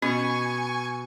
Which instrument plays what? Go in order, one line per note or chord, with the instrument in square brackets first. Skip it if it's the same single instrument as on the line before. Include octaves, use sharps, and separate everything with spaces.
[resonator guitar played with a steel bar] B2 [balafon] C#4 [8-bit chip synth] G#5 C#6